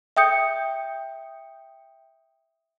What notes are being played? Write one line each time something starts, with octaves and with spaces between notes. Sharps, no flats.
E5 G5 D#6 G6 C#7